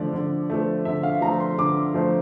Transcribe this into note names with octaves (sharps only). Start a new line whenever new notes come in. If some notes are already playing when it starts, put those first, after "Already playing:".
Already playing: D3 F3 A3 D5
D3
F3 A3
D3 E5
F5
F3 A3 A#5
C6
D3 D6
F3 A3